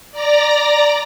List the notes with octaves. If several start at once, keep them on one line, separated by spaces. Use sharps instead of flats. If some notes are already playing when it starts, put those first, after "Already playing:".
D5 A#5 A#6